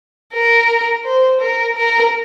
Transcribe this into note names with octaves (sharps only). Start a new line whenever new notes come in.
A#4
C5
A#4
A#4